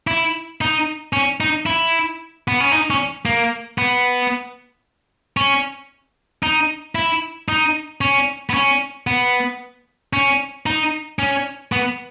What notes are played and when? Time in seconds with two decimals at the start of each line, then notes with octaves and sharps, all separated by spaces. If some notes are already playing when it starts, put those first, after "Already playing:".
0.07 E4
0.61 D#4
1.13 C#4
1.40 D#4
1.66 E4
2.48 B3
2.60 C#4
2.72 D#4
2.90 C#4
3.26 A#3
3.78 B3
5.37 C#4
6.43 D#4
6.95 E4
7.49 D#4
8.01 C#4
8.50 B3
8.54 C#4
9.07 B3
10.13 C#4
10.66 D#4
11.19 C#4
11.72 B3